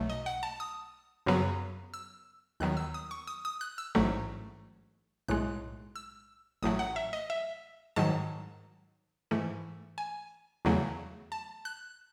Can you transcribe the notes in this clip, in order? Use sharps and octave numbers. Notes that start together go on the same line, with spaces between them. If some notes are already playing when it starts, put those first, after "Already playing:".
Already playing: B1 B2 F#3 A3
D#5
F#5
A5
D#6
F#2 C#3 F#3 B3
E6
D#2 D#3 F#3 B3 F#6
E6
D#6
C#6
D#6
D#6
F#6
E6
A1 G#2 F#3 A3
B1 A2 G#3 F#6
E6
A1 A2 F#3 A3 D#6
F#5
E5
D#5
E5
G#2 D#3 F#3 A5
G#2 E3 A3
G#5
E2 C#3 F#3 A3
A5
F#6